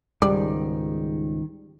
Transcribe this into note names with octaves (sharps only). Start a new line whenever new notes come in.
C#2 G#2 D#3 G3 D5